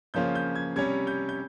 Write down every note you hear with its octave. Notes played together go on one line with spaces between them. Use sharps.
C#3 F3 A#3 C#4 F4 G6
G6
G#6
C3 G3 C#4 G#6
G6
G6